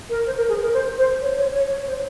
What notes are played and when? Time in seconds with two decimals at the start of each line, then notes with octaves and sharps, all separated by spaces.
0.09 A#4
0.25 C5
0.36 A#4
0.49 G#4
0.61 A#4
0.73 C5
0.97 C5
1.22 C#5
1.38 C#5
1.54 C#5
1.70 C#5
1.86 C5